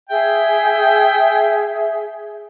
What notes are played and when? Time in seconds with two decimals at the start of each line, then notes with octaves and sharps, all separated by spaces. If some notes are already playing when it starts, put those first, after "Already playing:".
0.09 G#4 E5 G5